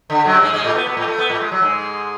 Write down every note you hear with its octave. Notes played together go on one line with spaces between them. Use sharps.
D3
F#2 F#3
G#2 G#3
G#2 G#3
A2 A3
B2 B3
B2 B3
A2 A3
A3
B3
A2 A3
G#3
F#3
G#2 G#3